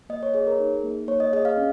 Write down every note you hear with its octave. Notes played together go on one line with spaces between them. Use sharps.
A#3 D#5
C#5
G#4 C#5
A#4
D#4
A#3
A#3 C#5
D#5
G#4 D#5
F5
C#4